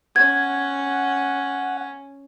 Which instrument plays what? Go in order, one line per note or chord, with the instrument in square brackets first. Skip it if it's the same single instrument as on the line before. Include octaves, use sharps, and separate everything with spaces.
[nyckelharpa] C#4 [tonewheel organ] F#5 [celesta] G#6